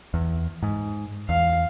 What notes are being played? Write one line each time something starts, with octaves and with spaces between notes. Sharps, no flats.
E2
G#2
E2 F5